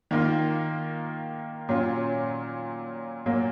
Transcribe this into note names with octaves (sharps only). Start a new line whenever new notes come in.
D#3 A#3 F4
A#2 F#3 C#4 F4
A#2 F#3 A#3